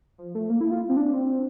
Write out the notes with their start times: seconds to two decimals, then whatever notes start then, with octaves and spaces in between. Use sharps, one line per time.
0.18 F3
0.35 A3
0.50 A#3
0.61 E4
0.71 F4
0.89 C4
0.97 D4
1.13 C4